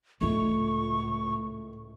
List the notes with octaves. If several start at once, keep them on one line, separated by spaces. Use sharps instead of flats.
C#2 A2 G#3 A3 F4 C#6